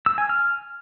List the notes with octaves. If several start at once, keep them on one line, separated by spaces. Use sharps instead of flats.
E6
G#5
F6